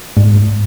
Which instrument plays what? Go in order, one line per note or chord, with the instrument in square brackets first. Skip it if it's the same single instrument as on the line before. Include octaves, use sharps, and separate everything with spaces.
[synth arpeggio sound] G#2